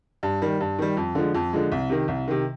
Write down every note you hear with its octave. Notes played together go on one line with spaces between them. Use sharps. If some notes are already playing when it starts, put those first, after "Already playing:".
G2
D#3 G3
G2
D#3 G3
F2
D3 F3 G#3
F2
D3 F3 G#3
C2
C3 D#3
C2
C3 D#3